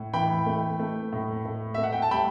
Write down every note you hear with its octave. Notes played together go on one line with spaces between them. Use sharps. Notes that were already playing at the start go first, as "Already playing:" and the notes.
Already playing: A2
E3 G5 B5
A3
A3
A2
A3
A3 E5
F#5
G5
A5
G3 G5 B5